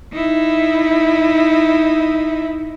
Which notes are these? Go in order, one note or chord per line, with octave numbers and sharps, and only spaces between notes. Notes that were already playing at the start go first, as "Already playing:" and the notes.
D#4 E4